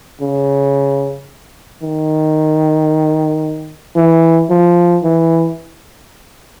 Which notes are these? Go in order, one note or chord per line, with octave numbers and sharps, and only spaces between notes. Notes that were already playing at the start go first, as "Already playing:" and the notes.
C#3
D#3
E3
F3
E3